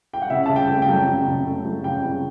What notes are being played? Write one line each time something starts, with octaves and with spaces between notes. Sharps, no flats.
G5
F#5
C#3 E5
C#3 A5
G5
A3
G5
F#3
C#3 G5
C#3
A3
F#3
C#3 G5
C#3